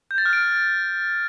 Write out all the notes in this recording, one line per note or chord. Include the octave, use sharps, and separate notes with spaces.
G6
A6
F6
D7